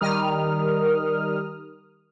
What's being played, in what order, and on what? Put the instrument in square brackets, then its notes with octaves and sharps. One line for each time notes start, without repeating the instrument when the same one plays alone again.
[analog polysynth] D#3 G3 A#4 D#6 F6